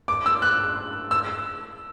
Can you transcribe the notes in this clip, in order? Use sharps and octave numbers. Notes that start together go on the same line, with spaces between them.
D6
E6
F#6
E6